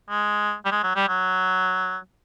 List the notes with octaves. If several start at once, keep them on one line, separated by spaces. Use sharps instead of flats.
G#3
G3
G#3
F#3
G3
F#3